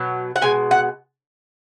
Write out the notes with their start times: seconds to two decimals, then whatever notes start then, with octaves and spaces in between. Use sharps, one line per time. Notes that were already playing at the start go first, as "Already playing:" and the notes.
Already playing: B2 F#3
0.36 F#5
0.42 B2 G#3 G#5
0.71 F#5